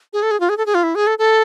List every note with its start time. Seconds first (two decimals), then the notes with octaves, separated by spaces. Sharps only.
0.13 G#4
0.23 A4
0.31 G#4
0.40 F4
0.49 G#4
0.58 A4
0.66 G#4
0.75 F4
0.83 E4
0.95 G#4
1.07 A4
1.19 A4